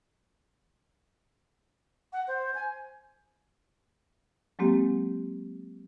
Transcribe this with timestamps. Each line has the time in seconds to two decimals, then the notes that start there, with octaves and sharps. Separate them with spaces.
2.13 F#5
2.28 C5
2.55 G#5
4.59 F#3 G#3 A#3 C4 G4